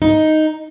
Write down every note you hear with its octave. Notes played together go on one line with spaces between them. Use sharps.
D#4